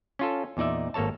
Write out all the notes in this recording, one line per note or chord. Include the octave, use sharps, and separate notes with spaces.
C#4 F4 A4
E2 A#2 D#4 D5 E5
G#1 A#3 A4 C#5 A5